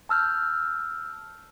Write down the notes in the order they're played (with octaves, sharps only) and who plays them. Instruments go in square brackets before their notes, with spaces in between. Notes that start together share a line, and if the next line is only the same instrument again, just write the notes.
[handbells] A5 E6 F6 G6